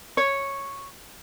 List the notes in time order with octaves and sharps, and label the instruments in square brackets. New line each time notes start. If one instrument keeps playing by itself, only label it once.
[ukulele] C#5